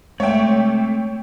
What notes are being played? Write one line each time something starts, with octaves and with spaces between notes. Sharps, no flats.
G#3 A3 C4 C#5 E5 G5